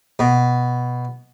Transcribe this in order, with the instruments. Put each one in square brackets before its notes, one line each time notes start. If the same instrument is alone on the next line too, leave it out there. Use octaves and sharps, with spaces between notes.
[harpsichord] B2